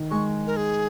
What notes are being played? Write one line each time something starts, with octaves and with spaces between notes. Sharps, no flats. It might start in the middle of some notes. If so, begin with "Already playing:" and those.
Already playing: D#3
G#3 C#6
A#4
G#4